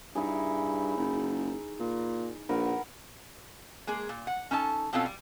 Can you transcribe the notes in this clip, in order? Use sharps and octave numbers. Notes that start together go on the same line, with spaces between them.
G2 D#4 E4 G#4
F#1 D#4 B5
A#2
A#1 A#4 B4 F#5
G#3 A#3 G#4
A#2
F#5
C#4 D#4 A4 A5
B2 C4 C#4 F4 A4 F5
G3